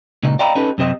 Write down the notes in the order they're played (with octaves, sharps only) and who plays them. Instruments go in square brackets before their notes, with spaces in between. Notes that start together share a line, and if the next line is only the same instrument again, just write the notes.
[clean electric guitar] C#2 A#2 C#3 D#4
D5 D#5 F5 G5 A#5 B5
C#4 D#4 G4 A4 B4
F#2 C3 C4 D#5